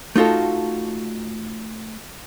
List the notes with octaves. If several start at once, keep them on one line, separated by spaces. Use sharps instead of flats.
A3 D#4 F4 F#4 A4